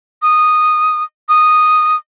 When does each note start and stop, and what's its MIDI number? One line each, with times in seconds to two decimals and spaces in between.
0.22 1.03 87
1.29 1.96 87